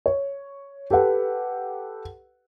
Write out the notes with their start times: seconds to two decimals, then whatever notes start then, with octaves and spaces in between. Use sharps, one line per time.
0.06 C#5
0.91 G4 A4 B4 F#5